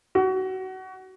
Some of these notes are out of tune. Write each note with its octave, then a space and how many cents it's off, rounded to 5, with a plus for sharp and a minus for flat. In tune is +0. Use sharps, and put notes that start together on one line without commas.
F#4 +25